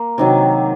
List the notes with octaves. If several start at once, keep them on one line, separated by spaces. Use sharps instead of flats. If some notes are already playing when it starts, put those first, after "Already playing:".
Already playing: A#3
C3 D#3 F#3